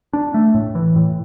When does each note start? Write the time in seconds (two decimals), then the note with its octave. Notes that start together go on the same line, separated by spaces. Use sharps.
0.13 D4
0.34 A3
0.54 A2
0.75 E3
0.96 A2